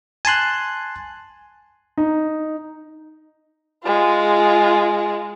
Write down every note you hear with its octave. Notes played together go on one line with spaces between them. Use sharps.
G#5 A5 C6 F#6
D#4
G#3 F4